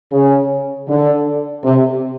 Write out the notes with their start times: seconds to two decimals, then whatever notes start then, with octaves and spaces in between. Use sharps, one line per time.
0.12 C#3
0.88 D3
1.64 C3